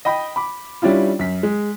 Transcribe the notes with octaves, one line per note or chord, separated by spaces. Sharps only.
D#5 G5 B5 D#6
B5 D6
G3 C#4 D4 E4 F4
F#2 B6
G#3